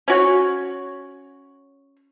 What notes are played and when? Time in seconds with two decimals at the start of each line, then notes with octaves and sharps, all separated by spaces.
0.08 C#4 F#4 C#5